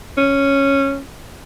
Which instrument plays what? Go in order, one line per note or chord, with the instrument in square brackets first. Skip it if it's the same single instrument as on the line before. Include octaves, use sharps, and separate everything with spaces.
[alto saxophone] C#4